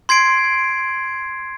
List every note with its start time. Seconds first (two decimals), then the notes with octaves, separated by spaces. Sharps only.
0.09 C6 G#6 C7 D7